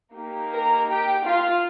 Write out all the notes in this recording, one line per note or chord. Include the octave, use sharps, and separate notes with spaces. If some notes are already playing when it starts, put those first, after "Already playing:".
A#3 D#4 G4
A#4 A#5
G4 G5
F4 F5